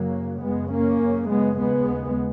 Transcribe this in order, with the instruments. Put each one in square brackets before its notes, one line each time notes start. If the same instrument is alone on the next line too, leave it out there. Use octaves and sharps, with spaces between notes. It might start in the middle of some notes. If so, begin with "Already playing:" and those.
Already playing: [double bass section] F#2 C#3 F#3 A#3
F#2 C#3 G#3 B3
A#3 C#4
F#2 C#3
G#3 B3
D#2 C#3 G#3 B3